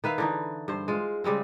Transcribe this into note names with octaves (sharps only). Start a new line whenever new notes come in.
D#3 B4 E5 F5
D3 E3 D#4
G2 C5
G#3 F4
C#3 G3 G#3 C4